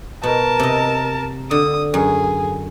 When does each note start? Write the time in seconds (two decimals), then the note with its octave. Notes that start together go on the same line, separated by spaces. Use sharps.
0.23 B2 A#4 A5
0.60 C3 D#5
1.51 D3 D#6
1.94 F#2 G#4